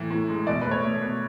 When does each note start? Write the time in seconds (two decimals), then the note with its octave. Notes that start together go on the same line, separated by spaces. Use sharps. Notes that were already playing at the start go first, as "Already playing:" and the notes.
Already playing: A2 E3
0.10 A2
0.28 G#3
0.47 B2 D5
0.62 A3 B4
0.71 C#5
0.84 A3
1.02 B2